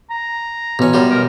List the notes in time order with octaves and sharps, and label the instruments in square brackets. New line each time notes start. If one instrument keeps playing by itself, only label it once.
[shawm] A#5
[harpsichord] A1 C#4 [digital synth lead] B2
[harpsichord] F#2 G3 F4
[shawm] A#4